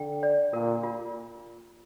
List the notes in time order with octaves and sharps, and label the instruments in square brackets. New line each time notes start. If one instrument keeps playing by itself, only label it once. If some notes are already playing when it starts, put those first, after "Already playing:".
Already playing: [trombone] D3 [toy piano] G5
[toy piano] D5
[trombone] A#2 [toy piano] A#4
[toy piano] F4